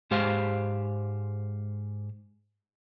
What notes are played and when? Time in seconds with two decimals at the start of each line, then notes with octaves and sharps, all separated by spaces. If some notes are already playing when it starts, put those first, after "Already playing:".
0.11 G#2 G#3 G4 C5 F5